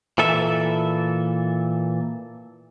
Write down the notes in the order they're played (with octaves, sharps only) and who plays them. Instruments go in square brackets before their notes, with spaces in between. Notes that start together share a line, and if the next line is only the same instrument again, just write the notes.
[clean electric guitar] A#2 E3 A4 E5